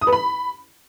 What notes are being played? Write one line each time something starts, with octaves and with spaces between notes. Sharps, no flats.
D#6
B4
B5